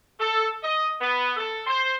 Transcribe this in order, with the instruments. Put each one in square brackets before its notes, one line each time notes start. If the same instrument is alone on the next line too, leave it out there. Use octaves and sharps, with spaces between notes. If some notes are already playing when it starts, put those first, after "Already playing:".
[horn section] A4
D#5
B3
A4
C5